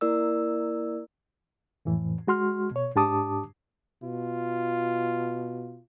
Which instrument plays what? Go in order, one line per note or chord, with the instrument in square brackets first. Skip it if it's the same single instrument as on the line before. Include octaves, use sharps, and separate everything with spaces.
[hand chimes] A#3 E4 A#4 D5 E6
[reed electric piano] F2 A2 E3
G#3 F#4 C6 F6
B2 C#5
G#2 D4 G4 A5 D6 D#6
[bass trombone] B2 [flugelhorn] F4